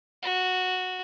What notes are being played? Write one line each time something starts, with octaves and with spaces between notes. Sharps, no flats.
F#4